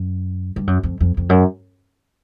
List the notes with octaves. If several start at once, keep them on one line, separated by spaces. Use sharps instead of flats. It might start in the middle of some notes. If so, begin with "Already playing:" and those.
Already playing: F#2
G2
F#2
F2
F2
F2
F#2